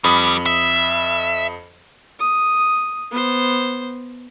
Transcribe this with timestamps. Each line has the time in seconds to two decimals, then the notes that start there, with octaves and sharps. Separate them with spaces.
0.04 F2 G3 B5 D#6
0.46 E5
2.19 D#6
3.11 B3 C5